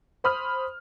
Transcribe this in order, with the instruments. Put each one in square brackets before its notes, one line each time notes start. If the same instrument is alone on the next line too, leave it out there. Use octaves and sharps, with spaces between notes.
[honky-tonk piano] C5 B5 D#6 F6